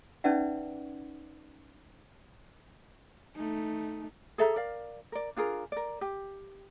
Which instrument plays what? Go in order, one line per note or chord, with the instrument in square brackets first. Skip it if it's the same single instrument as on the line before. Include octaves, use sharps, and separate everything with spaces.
[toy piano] C#4 D#4 B4 D5 E5 F#5
[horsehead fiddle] A3 D#4
[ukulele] G#4 A4 E5 A#5
A#4 D5 F5
A#4 D5
D4 F4 G#4 A#4
A#4 D5
G4